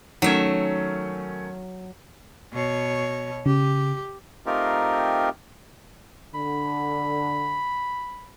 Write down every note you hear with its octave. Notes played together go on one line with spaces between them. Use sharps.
D#3 F#3 A3 C#4 E5
B2 C#5
C#3 G4
A3 C4 D#4 F4 G4 A#4
D3 B5